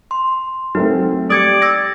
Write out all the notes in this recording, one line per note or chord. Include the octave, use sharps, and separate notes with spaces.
C6
F#3 A3 C4 D#4
G3 D5 D#6 G#6 C#7
E6 G#6 A#6